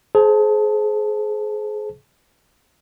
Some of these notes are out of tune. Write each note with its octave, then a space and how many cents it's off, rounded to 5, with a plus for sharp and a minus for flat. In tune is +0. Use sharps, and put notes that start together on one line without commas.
G#4 +30 C5 +0 A5 +0